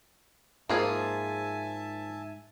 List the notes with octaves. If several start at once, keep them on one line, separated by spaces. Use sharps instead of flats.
G#2 F3 A#3 F4 G#4 E5 G#5 A5